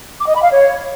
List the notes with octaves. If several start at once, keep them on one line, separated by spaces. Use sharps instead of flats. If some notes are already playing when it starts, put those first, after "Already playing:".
D6
D#5
B5
F5
C#5